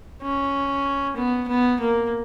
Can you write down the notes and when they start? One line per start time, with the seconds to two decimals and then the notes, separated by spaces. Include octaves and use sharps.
0.22 C#4
1.16 B3
1.48 B3
1.80 A#3